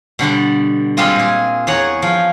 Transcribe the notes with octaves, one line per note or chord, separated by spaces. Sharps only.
B2 D3 G3 B3
G3 G#3 C4 F4 D#5
A#2 G#4
E2 G#4 C#5 F#5 A#5
F3 F4